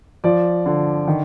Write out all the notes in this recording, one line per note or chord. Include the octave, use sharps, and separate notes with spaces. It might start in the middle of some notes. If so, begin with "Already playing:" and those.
F3 D5
D3
D#3